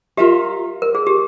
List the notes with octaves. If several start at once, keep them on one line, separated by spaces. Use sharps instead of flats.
F4 G4 A#4 E5
A#4
G#4
G4